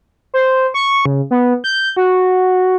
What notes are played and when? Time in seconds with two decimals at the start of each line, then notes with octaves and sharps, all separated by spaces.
0.34 C5
0.74 C#6
1.06 C#3
1.31 B3
1.64 G6
1.96 F#4